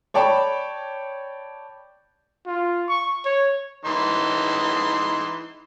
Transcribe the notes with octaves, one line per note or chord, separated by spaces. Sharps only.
C#5 D5 G5 A5 B5 C#6
F4
C#6
C#5
E3 D#4 C6